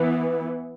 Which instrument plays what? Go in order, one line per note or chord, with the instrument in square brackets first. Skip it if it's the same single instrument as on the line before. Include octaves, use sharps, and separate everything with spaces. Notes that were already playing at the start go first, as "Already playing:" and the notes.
Already playing: [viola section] E3 B3